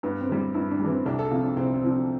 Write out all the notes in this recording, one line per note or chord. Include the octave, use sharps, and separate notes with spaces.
G2 B3
C4
E3 G3
G2 E4
D4
G3
E3 C4
C2 D4
A4
C3 F3 F4
D4
C2 C4
C4
C3 F3
D4